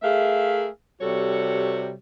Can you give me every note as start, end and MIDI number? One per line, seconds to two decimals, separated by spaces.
0.03 0.67 57
0.03 0.67 68
0.03 0.67 70
0.03 0.67 76
0.03 0.67 77
1.01 1.92 48
1.01 1.92 55
1.01 1.92 66
1.01 1.92 69
1.01 1.92 73